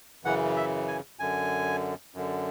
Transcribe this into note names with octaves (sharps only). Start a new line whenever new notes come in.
F#2 C#3 E3 F#5
E5
G#5
F#2 D3 G#5
F#2 D3